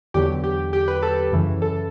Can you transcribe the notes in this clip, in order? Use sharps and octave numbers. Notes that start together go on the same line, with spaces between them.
E2 D3 F#3 G4
G4
G4
B4
A4
F#2 C#3 E3
A4